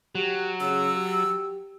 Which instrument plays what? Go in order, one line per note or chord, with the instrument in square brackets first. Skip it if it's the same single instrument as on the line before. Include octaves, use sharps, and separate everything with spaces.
[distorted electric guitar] F#3 [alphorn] G4
[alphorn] C#3 [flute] E6
[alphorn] G4